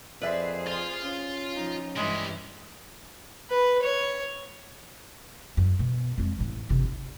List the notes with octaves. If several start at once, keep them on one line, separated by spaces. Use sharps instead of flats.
F2 G#4 B4 C5 D5 E5
F4 F5
C#4
F3 D#4
G2 E3 G3 G#3 E4
B4
C#5
F#2
B2
F2 G#3
A1 A2
G1 C3
D#2